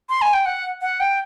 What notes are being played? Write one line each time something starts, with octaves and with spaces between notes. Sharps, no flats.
C6
G#5
G5
F#5
F#5
G5